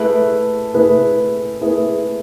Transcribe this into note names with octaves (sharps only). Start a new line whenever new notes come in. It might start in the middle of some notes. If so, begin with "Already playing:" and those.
Already playing: A3 E4 G#4 B4
A3 E4 G#4 B4
A3 E4 G#4 B4